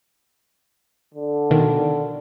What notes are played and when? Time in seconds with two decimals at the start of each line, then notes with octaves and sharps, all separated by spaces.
1.14 D3
1.51 B2 D#3